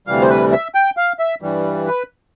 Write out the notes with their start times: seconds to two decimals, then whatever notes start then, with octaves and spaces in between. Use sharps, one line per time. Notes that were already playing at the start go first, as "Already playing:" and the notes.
0.07 D2 C3 E3 G3 F5
0.22 C5
0.30 B4
0.52 E5
0.75 G5
0.97 F5
1.19 E5
1.42 G2 E3 G3
1.87 B4